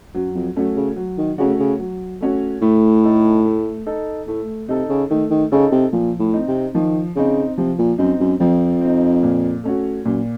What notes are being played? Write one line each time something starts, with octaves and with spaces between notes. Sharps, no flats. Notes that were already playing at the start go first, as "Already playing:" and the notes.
F#2 F#3
F2
F#2 A3 C#4 F#4
C#3
F#3
D#3
C#3 A3 C#4 F#4
C#3
F#3
A3 C#4 F#4
A2 A3
D#4 A4
A3
D#4 A4
A2 A3
C3 D#4 A4
C#3
D#3 A3
D#3
C#3 D#4 A4
C3
A#2 F3
A2
C4 D#4
C3
D#3 F3
C#3 C4 D#4
C3 F3
A#2
F#2 C4 D#4
F#2
F2 F3
C4 D#4
A#2
A3 C#4 F#4
F#2 A#2